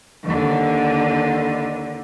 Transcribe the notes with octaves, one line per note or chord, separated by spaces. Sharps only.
D#2 D3